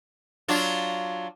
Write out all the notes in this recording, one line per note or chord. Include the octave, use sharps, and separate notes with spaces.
F#3 D4 F4